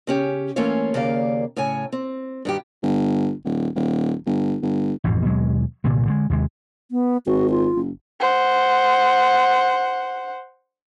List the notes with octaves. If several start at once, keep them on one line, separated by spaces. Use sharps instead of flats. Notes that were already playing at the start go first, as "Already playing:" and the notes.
C#3 C#4 G4
E3 A3 A#3 C#4 F4 C#5
D#2 C#3 A#3 D5 F5
A2 C#3 C#5 G#5
C4
G2 D#3 G4
G1
D#1
D#1
G1
G1
A1 F2 G#2 B2
D#2 B2 F#3 G#3
C2 G2 A#2 D3
D3 D#3 G#3
D#2 C3 G#3
B3
G#1 F#4
F4
F#1
C5 F#5